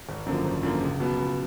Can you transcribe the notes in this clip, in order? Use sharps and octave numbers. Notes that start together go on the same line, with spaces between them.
G#1
F#2 D3 F3 A#3
G#1
F#2 D3 F3 A#3
C#2
B2 F#3 B3
C#2